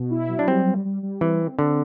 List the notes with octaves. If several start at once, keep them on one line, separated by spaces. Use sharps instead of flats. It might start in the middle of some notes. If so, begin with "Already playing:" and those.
Already playing: B2
E4
F#3
D4
G3 C4
G3
G3
G3
E3 C4
C4
D3 C4